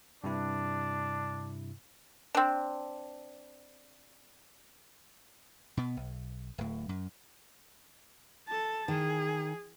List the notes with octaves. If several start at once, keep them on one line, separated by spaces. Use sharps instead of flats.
G2 C3 D4 E4
C4 D4
B2 B3
B1
D1 A2
F#2
A4 A5
D#3 G#4